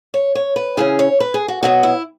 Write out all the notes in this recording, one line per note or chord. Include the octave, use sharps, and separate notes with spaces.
C#5
C#5
B4
C#3 E3 C#4 G#4
C#5
B4
G#4
F#4
B2 F#3 B3 F#4
E4